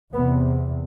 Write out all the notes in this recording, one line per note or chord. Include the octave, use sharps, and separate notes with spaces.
E2 C3 B3